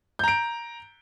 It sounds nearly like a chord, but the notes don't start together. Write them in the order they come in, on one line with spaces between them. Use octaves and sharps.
G6 A#5 D7